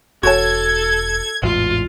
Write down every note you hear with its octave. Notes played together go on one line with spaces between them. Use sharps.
E1 F#4 A4 C#5 A5 G#6
A1 E2 G#2 F4